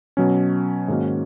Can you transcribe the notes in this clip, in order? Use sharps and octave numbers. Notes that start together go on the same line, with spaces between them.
B2 F#3 C#4
G#2 D#3 A#3 C#4 F#4